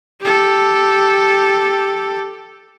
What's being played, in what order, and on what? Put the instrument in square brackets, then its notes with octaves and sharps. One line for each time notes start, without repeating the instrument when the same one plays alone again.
[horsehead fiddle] G4 A4